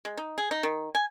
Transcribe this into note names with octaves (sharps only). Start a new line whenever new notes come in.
G#3
D#4
G#4
D#4
D#3
G#5